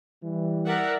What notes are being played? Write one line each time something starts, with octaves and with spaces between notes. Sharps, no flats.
E3 G3
A#4 D5 E5 F#5